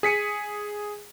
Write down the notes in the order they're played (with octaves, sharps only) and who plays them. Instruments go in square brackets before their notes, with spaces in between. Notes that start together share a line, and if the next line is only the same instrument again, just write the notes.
[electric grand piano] G#4 B6 C#7 D#7